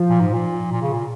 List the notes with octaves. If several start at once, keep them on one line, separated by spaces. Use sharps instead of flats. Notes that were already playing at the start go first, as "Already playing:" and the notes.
Already playing: F3
A#2
G#2
A#2
A#2
C#3
A#2